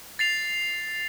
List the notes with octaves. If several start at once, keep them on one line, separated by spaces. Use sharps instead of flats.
A6 C7 F7